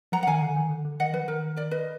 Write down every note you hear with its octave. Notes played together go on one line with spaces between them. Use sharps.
F3 F#5 A#5
F#5
D#3 F5 G#5
D3
D#3
D3
D3
D#3 D#5 F#5
F3 B4
D#3 A#4
A#4 D5
B4 D#5